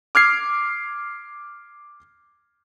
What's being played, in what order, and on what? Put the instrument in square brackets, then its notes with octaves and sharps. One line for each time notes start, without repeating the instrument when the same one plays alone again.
[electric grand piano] D6 F6 G#6 C7